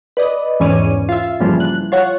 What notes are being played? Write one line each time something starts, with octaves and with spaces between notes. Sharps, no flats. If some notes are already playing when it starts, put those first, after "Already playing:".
B4 D5 D#5
E2 G#2 E3 C#4 D5 D#7
F4 E5
G2 A#2 C#3 E3 F3 G3
F#6
F4 C#5 F#5